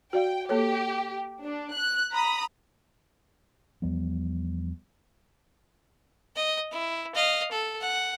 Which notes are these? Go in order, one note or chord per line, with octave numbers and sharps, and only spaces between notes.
F#4 D5 F5 G5
A#3 G4 A4 C#5
D4
F#6
A#5 B5 D#6
E2 F3 G3 B3
D#5
E4
D#5 F5
A4
F#5